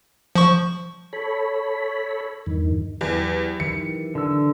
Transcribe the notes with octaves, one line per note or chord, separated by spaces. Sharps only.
F3 C#6
A4 C#5 B5
E2 G2 D#3
E2 F#3 G4
D#3 E3 C#7
D3 E6